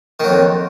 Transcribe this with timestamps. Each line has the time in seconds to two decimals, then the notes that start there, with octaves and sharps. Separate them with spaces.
0.20 D#3
0.24 F#3
0.28 F2